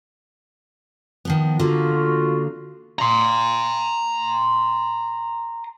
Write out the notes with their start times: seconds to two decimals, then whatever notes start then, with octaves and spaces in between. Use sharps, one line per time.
1.25 D#3 F3 B3
1.59 D3 A#3 F4 F#4
2.99 A#5 C6